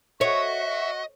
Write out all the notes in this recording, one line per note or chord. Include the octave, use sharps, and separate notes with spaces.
F#4 C#5 D#5 E5 C#6